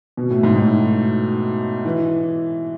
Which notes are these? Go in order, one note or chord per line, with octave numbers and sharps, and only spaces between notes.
B2
A2
G#2
A2
E3